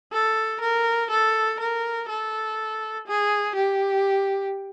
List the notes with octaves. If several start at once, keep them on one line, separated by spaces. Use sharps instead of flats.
A4
A#4
A4
A#4
A4
G#4
G4